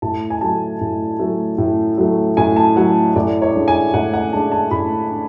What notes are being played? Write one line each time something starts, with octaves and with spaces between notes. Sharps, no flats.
A2 A5
G#5
F#3 A3 A5
A2
F#3 A3
A2
F#3 A3
A2 G#5
A5
F#3 A3 F#5
A2 D5
C#5
G#3 D4
G#5
A2 F#5
F#5
G#3 D4 A5
A5
A2 B5
D4